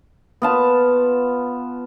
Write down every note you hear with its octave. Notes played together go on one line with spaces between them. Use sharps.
B3 F4 A5